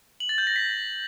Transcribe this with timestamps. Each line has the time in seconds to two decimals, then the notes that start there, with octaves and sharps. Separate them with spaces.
0.20 F#7
0.29 A6
0.38 G6
0.47 A#6
0.56 B6